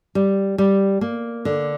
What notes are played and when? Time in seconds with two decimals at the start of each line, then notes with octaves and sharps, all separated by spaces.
0.15 G3
0.58 G3
1.01 A#3
1.45 D3